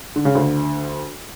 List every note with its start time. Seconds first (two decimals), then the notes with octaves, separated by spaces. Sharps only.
0.16 D3
0.25 C#3
0.35 D2 D3